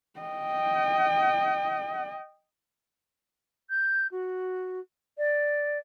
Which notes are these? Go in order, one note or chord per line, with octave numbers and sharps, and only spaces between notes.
D#5 G5
G6
F#4
D5